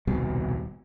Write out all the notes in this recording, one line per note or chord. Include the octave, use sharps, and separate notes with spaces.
D#1 C2 B2 G3